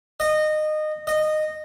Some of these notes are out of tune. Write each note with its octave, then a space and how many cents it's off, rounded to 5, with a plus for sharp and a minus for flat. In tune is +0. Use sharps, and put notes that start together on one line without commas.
D#5 -20
D#5 -15